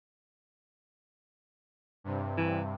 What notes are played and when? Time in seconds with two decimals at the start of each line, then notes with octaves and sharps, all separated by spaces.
2.04 G2 C3
2.38 E3